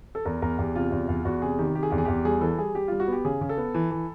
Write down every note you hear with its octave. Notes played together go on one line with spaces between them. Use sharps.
A4
E2 A#4
E2 A#4
E2 G4
C3 F4
E2
E2
E2 F#4
C3 G#4
D#3 G4
C3 G4
G#4
E2 G4
G#4
E2 G4
G3 G#4
E3 A4
G3 G#4
G3 G4
G3 F4
F#4
B3 G4
C#3 G#4
C#3
A4
B3
E3
E3